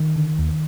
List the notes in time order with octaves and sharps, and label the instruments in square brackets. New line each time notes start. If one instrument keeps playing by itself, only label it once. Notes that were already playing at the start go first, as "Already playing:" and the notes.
Already playing: [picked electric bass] D#3
D3
D#2